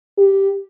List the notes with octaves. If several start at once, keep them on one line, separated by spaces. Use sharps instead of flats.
G4